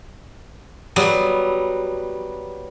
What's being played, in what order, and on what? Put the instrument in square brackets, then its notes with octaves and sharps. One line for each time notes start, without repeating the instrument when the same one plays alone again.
[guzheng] F#3 G3 B3